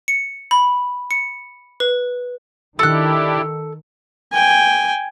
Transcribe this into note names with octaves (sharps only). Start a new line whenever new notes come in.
C#7
B5
C#7
B4
D#3 D4 E4 G4 A4 F#6
G5 G#5